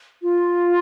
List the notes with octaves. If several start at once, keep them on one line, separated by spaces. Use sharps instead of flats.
F4